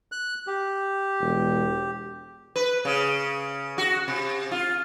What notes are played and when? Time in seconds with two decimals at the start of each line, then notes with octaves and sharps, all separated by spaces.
0.12 F#6
0.47 G4
1.21 E1
2.56 B4
2.85 C#3
3.78 F#4
4.08 C3
4.51 F4